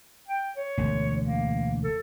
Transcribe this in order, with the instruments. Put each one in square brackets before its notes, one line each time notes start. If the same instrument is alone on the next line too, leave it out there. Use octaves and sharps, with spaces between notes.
[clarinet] G5
C#5
[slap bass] E1 D2
[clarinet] A#3
A4